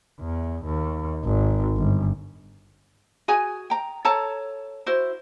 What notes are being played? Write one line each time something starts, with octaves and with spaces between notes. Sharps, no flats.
E2
D#2
G#1
G1
F#4 G#4 G#5
G5 A#5
A4 C#5 A5 A#5
E4 F#4 C5